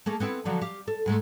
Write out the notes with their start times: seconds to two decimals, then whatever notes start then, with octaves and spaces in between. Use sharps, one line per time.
0.06 A3 A#3 G#4
0.20 B3 C4 E4
0.45 D3 F3 F#3
0.62 G4 F5
0.88 A4
1.06 G#2 G#3 A3